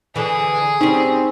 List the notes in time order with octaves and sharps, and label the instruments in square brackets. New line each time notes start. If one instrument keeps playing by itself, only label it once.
[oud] D3 E3 [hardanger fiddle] G#4
[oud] G3 C#4 [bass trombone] C4 [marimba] D#4